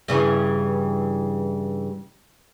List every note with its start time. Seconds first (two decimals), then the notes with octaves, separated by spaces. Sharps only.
0.08 G2 C#3 E3